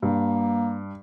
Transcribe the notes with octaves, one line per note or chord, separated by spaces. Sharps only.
G2 A#3